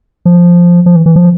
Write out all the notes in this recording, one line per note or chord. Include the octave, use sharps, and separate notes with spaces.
F3
F3
E3
E3
F3